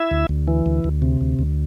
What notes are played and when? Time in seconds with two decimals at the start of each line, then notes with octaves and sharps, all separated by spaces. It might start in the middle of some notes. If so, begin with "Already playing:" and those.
Already playing: E4 E5
0.11 D2
0.29 D2
0.48 E3
0.66 D2
0.84 D2
1.02 C3
1.21 D2
1.39 D2